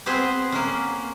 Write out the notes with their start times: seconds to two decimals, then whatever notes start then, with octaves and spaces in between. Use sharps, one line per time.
0.06 B3 C4 G#4 B4 C5
0.52 A#3 C#4